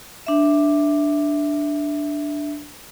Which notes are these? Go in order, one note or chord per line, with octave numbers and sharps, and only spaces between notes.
D4 E5